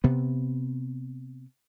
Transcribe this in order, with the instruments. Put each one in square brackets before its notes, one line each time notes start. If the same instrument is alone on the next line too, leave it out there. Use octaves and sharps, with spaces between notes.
[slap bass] C3 B3